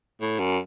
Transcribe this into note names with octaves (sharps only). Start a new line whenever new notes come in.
A2
F#2